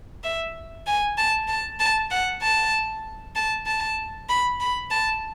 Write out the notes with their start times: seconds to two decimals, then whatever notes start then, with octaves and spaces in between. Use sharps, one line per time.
0.24 E5
0.86 G#5
1.17 A5
1.48 A5
1.79 A5
2.11 F#5
2.42 A5
3.35 A5
3.66 A5
4.29 B5
4.60 B5
4.91 A5